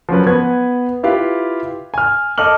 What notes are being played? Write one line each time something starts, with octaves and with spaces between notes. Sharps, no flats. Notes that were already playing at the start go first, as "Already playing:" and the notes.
F3 F#3 C#4 B4
B3 B4 G#6
E4 F4 G4 B4 F5
G#5 F6
A4 D#5 D6 F6 F#7